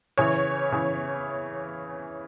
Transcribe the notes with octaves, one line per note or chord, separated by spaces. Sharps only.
C#3 E3 C#5
C#3 E3